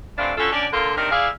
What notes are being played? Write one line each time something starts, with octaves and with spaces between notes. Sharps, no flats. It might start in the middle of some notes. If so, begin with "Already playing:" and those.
C3 E3 A3 C4 D4 F5
D3 C#4 F4 F#4 A4
B2 C#4 D4 D5
A#2 D3 A#3 F4 A4 A#4
C3 D#3 D4 A#4
E4 G#4 D5 E5 F5